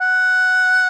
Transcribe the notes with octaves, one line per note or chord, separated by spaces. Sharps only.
F#5